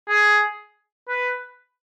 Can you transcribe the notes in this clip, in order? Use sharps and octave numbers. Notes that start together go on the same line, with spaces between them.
G#4
B4